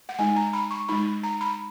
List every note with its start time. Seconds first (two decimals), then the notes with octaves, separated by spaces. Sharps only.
0.09 F#5
0.19 G#3 D#4 G#5
0.36 A#5
0.53 B5
0.71 C#6
0.88 G#3 D#4 B5
1.24 A#5
1.41 B5